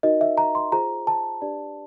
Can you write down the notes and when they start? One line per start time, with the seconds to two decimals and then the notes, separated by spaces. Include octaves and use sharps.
0.03 D#4 F#4 A#4 D#5
0.21 E5
0.38 A#5
0.55 C6
0.72 F4 G#4 C5 A#5
1.07 A5
1.41 D4 G4 B4 D5